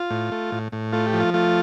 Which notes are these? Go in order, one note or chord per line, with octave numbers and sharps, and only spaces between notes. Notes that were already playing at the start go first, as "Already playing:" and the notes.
Already playing: F4
A2
A3
A2
A2
A3 F4
G4
F3
F4
A3 F4